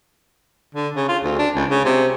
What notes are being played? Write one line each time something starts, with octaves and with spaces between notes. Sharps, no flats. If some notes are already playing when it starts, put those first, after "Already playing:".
D3
C#3
F4
D2
D4
C#2
C#3
C3